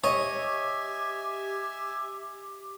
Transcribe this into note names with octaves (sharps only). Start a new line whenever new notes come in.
G4 C#5 D#5 E5 G#5